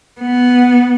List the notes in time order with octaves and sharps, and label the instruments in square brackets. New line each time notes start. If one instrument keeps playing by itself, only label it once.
[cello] B3